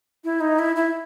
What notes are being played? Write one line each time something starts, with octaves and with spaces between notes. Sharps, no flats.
E4
D#4
E4
E4